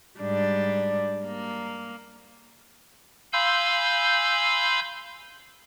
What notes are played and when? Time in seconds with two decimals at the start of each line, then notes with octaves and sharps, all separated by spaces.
0.20 G#2 G3 D4
1.27 A#3
3.33 F5 G#5 B5 C6 E6 G6